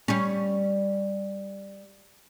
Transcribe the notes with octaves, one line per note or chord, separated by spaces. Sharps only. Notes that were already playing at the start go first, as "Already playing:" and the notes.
G3 C#4